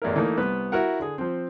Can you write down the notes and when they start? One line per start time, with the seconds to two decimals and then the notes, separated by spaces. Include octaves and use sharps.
0.02 A1 E2 E4 A#4
0.16 E3 A3 A#3 D#4
0.38 C2 B3 B4
0.72 E4 F#4 A#4 F#5
1.00 D3 G#4
1.18 F3 C4